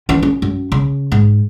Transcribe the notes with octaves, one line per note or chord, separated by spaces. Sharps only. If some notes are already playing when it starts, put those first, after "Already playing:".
E3 C#4
C#4
F#2
C#3
G#2